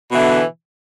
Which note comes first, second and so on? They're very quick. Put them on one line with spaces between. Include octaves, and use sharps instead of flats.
B2 E3 D3